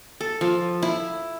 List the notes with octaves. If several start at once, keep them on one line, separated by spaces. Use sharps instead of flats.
A4
F3
E4